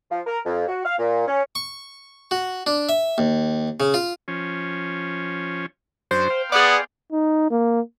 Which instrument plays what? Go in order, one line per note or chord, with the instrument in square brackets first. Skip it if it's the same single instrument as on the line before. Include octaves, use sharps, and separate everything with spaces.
[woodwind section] F3
A#4
F2
F#4
F5
A#2
C#4
[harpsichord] C#6
F#4
D4
E5
D#2
C#3
F4
[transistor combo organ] F3 C#4
[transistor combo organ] F#2 F#3 D4 [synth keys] C5
[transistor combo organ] F5 G5 C6
[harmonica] B3 [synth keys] G#4 D5
[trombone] D#4
A#3